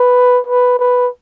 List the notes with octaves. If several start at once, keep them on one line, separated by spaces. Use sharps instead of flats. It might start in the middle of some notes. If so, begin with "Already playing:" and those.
Already playing: B4
B4
B4